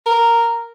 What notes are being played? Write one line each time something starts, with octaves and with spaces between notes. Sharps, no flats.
A#4